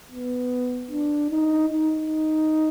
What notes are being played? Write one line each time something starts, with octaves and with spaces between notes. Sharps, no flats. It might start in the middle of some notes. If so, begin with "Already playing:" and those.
B3
D4
D#4
D#4